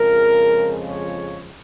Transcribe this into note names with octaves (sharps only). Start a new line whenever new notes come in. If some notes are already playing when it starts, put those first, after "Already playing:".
Already playing: F2 C#3 F3 G#3 A#4
C#5